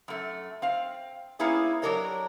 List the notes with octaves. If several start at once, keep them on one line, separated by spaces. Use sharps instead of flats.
F#2 A3
C4 F5
A#3 B3 C#4 E4 G#4
F#3 D4 G4 A#4 C#5 D#5